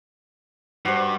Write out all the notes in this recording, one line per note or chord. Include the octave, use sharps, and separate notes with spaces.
G2 F#4 C5